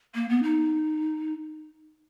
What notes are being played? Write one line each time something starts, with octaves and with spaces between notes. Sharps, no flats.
A#3
B3
D#4